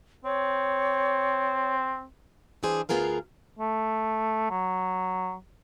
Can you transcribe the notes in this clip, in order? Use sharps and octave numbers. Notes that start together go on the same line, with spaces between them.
C4 C#5
E3 G3 D4 G#4 C5
D2 B3 F4 G#4 A#4 F5
A3
F#3